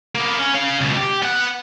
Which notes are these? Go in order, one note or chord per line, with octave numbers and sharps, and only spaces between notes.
A#3 B3
C#4
C#4 F5
C#2 B2
G4
B3 F#5